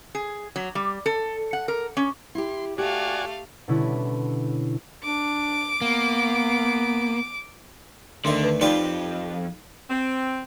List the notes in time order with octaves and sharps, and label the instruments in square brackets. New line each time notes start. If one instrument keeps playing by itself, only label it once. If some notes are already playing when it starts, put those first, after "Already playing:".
[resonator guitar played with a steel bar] G#4
F#3
G3
A4
F#5
A#4
C#4
[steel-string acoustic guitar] E4 G4 [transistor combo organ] C6
[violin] A3 F5 [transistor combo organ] F#4 D5 G#5 [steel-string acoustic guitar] G4
[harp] B2 D3 G3 C#4 E4
[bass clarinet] D4 [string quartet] D6
[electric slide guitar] A#3 [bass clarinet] B3
[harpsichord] D2 D#3 E5 [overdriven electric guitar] D3 [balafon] C6
[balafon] B4
[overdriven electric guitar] F2 [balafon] D#4 D5 [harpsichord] F4 G4 B4
[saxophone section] C4